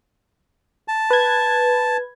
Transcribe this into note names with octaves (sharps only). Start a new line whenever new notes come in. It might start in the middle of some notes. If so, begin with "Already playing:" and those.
A5
B4 G#6